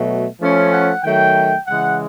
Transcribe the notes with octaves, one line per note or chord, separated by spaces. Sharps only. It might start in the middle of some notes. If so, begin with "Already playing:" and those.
Already playing: B2 F#3 A3
F3 A3 C#4
F#5
D#3 F#3 A3 G5
C#3 E3 G#3 F#5